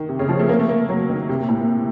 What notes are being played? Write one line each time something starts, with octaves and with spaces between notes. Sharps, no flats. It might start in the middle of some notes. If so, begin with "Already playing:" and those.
Already playing: D#3
C3
C#3
F3
A3
A#3
A3
A#3
A3
F#3
D#3
C3
A#2
A2
A#2